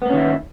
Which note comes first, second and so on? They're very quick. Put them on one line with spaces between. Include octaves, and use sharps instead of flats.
B3 A#3 C#4 D#3 E4